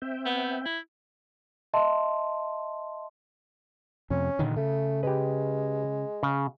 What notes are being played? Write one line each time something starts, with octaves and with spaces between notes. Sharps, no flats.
C4 E5 G5
B3
E4
D#5 E5 A5 C6
F2 C3 C#4
A#2 D3 D#3
C#3 A3
G#3 G4 B4
C#3